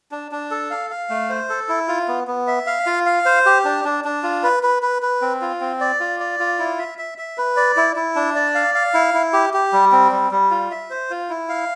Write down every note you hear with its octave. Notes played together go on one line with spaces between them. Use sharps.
D4
D4
A4
F5
F5
A3
C5
A4
E4
F4
B3
B3
E5
F5
F4
F5
C5
G4
D4
D4
D4
F4
B4
B4
B4
B4
C4
F4
C4
D5
F4
D5
F4
E4
E5
E5
E5
B4
D5
E4
E4
D4
D5
F5
F5
E4
E4
G4
G4
G3
C4
G3
G3
F4
E5
C5
F4
E4
F5